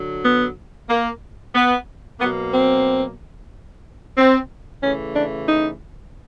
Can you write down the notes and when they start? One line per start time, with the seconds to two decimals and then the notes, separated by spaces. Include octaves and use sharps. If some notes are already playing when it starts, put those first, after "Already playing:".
Already playing: D3 F#3
0.25 B3
0.90 A#3
1.55 B3
2.20 B2 F#3 A#3 B3
2.54 C4
4.18 C4
4.82 C#3 E3 A3 C#4
5.16 D4
5.48 D#4